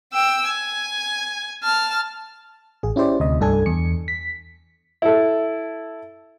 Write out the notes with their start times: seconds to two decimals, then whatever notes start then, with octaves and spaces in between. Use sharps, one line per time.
0.13 G5 E6
0.47 G#5
1.63 A5 F6
2.83 A1 G#4
2.96 C#4 E4 G4 C5 D5
3.20 D2 C3 D#5
3.40 C2 G2 D4 A4 G#5 G#6
3.66 E2 C#7
4.08 B6
5.02 E4 A4